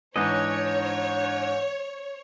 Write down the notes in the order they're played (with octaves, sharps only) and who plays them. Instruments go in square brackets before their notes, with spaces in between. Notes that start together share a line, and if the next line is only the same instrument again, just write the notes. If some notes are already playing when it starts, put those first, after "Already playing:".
[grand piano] G#2 E3 [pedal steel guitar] D4 D#5 [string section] C#5